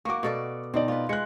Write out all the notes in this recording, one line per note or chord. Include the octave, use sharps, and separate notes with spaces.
A#3 F#4 C#6 D6
B2 A4 D5
B2 C4 D#4 D5
F4 B4
G#3 F#6 C#7